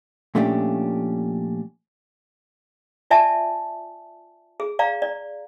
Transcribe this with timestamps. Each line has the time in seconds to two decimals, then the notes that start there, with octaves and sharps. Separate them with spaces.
0.35 A#2 F3 A3 C#4 D4 G4
3.10 F4 D5 E5 G#5 A5
4.60 G#4
4.79 D5 F5 A#5
5.02 D5